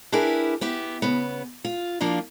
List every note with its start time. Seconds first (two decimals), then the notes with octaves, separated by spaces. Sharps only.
0.12 D4 E4 G4 G#4 A#4 B4
0.61 B3 G4 E5
1.02 C#3 B3
1.65 F4
2.00 F3 A#3 D4 F4